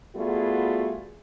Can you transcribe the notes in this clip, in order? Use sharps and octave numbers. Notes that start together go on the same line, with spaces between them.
G3 A3 B3 F4 F#4 G#4